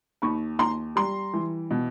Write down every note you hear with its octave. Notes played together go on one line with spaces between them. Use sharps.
D#2 B5 C#6
D#2 A#5 C6
G3 A#5 C6
E3
B2